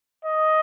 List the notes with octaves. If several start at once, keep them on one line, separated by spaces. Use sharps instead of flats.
D#5